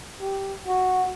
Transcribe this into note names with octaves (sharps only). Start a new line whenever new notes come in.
G4
F#4